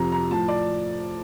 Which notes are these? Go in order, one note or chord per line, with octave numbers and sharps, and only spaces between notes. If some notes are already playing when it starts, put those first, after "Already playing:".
Already playing: F2 C3 F3 A#5
A#5
A2 F3 A5
D5